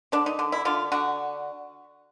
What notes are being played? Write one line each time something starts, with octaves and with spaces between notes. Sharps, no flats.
D3 D4
D#4
D3
E4
D3 F4
D3 F#4